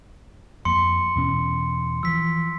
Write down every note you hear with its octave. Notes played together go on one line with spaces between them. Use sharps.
F2 A#3 C6 C#7
E2 B2 C#4
E3 F3 E6 B6